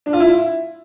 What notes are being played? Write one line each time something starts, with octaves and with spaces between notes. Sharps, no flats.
D4
F4
E4